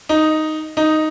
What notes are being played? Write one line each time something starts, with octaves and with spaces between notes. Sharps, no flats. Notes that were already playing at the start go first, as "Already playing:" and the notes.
D#4
D#4